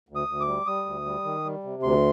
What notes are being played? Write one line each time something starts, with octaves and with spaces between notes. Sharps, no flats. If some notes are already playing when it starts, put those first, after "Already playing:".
D2
D#6
D2
D6
G3
G3 D#6
D2
G3
D#3
G3
C3
D2 C6